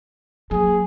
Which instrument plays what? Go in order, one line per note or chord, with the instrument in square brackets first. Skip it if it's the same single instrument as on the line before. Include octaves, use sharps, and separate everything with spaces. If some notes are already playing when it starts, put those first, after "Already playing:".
[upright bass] F#3 A#3 [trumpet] G#4